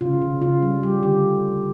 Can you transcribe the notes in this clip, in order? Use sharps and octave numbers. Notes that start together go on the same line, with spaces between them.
C#3 F4
C#3
C#3 F4
G3
G3 G4
D3 G4